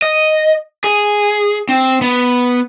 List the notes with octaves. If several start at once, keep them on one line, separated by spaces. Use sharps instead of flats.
D#5
G#4
C4
B3